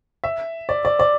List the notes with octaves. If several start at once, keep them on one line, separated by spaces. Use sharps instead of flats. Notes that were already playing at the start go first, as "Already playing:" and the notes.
E5
D5
D5
D5